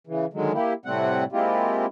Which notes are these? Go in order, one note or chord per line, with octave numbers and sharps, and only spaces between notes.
C#3 E3
D3 D#3 F#3 G#3
A#3 E4 G4
A2 C3 G3 A3 C4 F#5
G#3 A#3 C4 E4 F4 G4